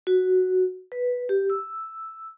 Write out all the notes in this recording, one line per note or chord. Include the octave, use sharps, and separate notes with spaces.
F#4
B4
G4
E6